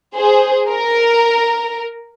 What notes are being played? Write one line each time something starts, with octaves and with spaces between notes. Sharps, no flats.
G#4 C5
A#4